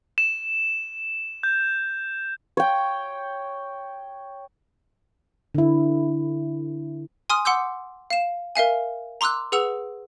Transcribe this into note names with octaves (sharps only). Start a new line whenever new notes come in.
E7
G6
C#5 G5
D3 E4
G#5 C6 D#6 F6
F#5 C6 D6 E6 G6
F5 E7
A#4 E5 F5 G#5
A#5 C6 D6 E6 F#6
G#4 B4 F#5 E6 F7